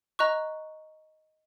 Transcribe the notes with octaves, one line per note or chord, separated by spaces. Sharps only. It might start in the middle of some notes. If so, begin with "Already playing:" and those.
D#5 A#5 C#6 F#6